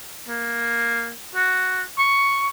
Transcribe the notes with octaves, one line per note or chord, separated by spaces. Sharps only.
A#3
F#4
C#6